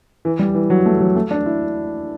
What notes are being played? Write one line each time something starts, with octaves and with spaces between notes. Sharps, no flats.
E3
G3
E3
F#3
A3
F#3
A3
D4
E4